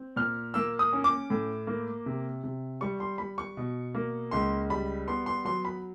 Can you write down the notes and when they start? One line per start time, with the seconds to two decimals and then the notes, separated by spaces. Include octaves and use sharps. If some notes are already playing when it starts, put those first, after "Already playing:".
Already playing: C4
0.16 A#2 F6
0.54 A#3 E6
0.79 D#6
0.93 C#4
1.04 D6
1.30 A2
1.67 A#3
2.06 C3
2.43 C3
2.81 G3 C#6
3.00 C6
3.18 G3 B5
3.38 C#6
3.57 B2
3.95 A#3
4.31 C#2 C6
4.70 G3 B5
5.07 B3 C6
5.26 C6
5.45 F#3 C6
5.65 B5